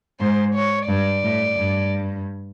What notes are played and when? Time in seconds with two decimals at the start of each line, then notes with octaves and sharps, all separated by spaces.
0.20 G#2 C5
0.55 C#5
0.88 G2 D5
1.24 A2
1.58 G2